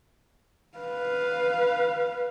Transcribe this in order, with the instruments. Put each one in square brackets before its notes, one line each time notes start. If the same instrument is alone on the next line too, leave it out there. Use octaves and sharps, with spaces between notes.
[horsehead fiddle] B4 F5